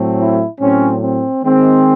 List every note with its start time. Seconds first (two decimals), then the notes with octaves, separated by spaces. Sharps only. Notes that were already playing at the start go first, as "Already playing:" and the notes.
Already playing: A2 F#3 A3 C4
0.19 E4
0.60 A2 F#3 C4 C#4
1.01 C4
1.44 D#3 G#3 C4